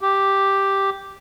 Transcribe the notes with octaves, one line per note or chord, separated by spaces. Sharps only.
G4